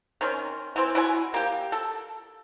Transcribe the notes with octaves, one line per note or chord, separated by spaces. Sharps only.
D#3 C4 C#4
E3 C4
E4 F#4 C#5 G#5
A#3 G4
A4